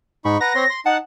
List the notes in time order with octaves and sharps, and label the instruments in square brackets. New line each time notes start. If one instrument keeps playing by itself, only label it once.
[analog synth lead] G#2 [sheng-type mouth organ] D#4 B5 C#6
[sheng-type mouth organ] B4 F#5 A#5 [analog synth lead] A#6
[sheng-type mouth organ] C4 C#5 C6
C6
[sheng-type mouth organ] D#4 A5 [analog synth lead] F#5